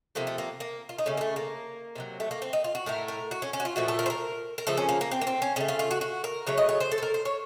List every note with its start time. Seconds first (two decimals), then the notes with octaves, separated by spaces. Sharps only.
0.15 C3 F3 A3 A#3
0.27 A3
0.38 A#3
0.60 A#3
0.89 F4
0.98 D#4
1.06 C#3 A3 C#4
1.17 A#3
1.21 A3
1.36 A#3
1.96 C3 D#3 F#3
2.20 A3
2.31 A#3
2.42 C4
2.53 D#4
2.64 F4
2.75 F#4
2.86 A2 A3 A#4
3.08 A#4
3.31 F#4
3.42 C#4
3.53 C#4
3.60 F#4
3.65 F4
3.76 A#2 F3 A3 F#4
3.88 A4
3.99 A#4
4.06 C5
4.10 A#4
4.58 A#4
4.67 C#3 F3 A3 A4
4.77 C#4
4.89 A#3
5.01 A#3
5.11 C4
5.21 A#3
5.27 C4
5.42 C#4
5.56 C#3 A3 C#4
5.68 F4
5.79 F4
5.91 F#4
6.01 F#4
6.24 A#4
6.47 C#3 F#3 A3 C#5
6.58 D#5
6.69 C#5
6.80 C5
6.92 A4
6.98 C5
7.03 A#4
7.14 C5
7.25 C#5